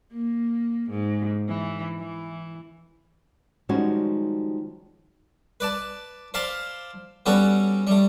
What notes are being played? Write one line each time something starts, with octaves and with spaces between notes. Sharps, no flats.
A#3
G#2
E3
E3
D#3 F3 G3 G#3 C#4 F#4
B4 D5 A5
C5 D5 F5 A5 B5 C6
G3 B3 C#4 F#4 A4
G3 A3